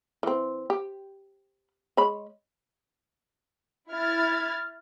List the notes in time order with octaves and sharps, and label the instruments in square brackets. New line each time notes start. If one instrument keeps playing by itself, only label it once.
[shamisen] E3 C4
G4
G#3 C#5 B5
[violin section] E4 F6 G#6 A6